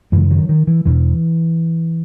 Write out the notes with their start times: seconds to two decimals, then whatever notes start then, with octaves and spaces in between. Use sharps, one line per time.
0.12 F#2 C#3 E3 G#3
0.30 D#3 F#3
0.49 D#3
0.67 E3
0.86 E2 B2 E3